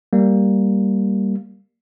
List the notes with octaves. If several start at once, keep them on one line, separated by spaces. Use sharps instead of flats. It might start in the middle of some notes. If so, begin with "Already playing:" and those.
G3 A#3